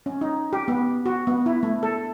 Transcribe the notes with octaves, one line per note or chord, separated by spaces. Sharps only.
C#4
D#4
G4
B3
F#4
B3
E4
A3
A4